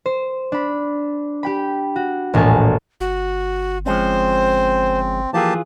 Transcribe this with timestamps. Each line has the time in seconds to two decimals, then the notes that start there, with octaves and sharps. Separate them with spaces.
0.06 C5
0.52 D4 B5
1.43 G4 G5 B5
1.96 F#4
2.34 E1 A#1 A2 G#5 A5
3.00 G1 F#4
3.86 F3 G#3 C4 C#4 C5
5.34 E3 F3 A#3 F4 G4 G#4 A5